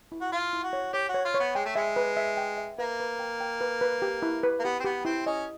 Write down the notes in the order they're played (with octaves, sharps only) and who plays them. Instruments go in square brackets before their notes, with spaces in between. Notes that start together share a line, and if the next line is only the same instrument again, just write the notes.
[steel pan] E4
[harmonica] F#4
[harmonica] F4 [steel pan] F5
[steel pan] E4
[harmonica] F#4
[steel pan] C#5
[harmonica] G4 [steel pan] C#5
[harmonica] F#4
[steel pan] C#5
[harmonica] F4
[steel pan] C#5
[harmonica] B3
[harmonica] G#3 [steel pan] G5
[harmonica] A3
[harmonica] G#3 [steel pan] E5
[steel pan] B4
E5
G5
E5
[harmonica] A#3 [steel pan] B4
[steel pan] B4
G5
G5
B4
B4
G4
E4
B4
[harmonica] A#3
[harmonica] B3 [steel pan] G4
[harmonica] C4
[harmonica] B3 [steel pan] G4
[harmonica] C4 [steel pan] E4
[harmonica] C#4 [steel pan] D#5